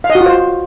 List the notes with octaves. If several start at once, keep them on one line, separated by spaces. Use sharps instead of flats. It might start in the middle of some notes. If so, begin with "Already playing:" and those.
F5
D#5
F#4
F4
C5